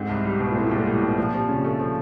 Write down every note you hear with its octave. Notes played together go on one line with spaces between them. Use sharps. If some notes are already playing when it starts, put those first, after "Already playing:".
Already playing: G#2 C4
C2
G3
B2
A#2
A2 C4
A#2
C2 G#2
A2 G3
B2
A#2 F3
C3 F3
C#3 C#4
A3
F3